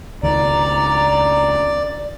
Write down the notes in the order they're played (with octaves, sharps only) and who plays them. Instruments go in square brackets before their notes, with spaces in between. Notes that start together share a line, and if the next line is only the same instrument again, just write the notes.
[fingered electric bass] C#2 D#3 [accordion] D5 [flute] A#5